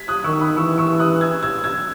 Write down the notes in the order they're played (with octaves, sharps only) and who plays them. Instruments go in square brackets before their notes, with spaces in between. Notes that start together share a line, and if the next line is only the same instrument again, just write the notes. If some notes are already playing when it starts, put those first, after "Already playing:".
Already playing: [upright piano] G#6 B6
D#6 F#6
[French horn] D#3 [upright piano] C#6 E6
[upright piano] B5 D#6
[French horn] E3 [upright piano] C#6 E6
[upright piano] C#6 E6
D#6 F#6
E6 G#6
E6 G#6
E6 G#6